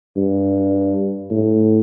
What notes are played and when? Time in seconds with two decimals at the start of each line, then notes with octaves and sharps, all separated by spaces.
0.16 G2
1.31 A2